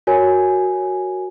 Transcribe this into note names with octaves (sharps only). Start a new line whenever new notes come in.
F#4 A#4 C#5 G#5